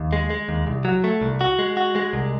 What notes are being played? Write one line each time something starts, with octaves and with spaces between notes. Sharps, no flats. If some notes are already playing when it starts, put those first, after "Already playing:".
Already playing: D#2
G#3
G#3
D#2
C2
F#3
A3
C2
F#4
G#3
F#4
G#3
C2